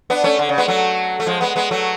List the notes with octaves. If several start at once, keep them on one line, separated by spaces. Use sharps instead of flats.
B3 D4
A3 C#4
D3
C#3
G#3 B3
F#3 A3
A3
F3 G#3
G#3 B3
G#3 B3
F#3 A3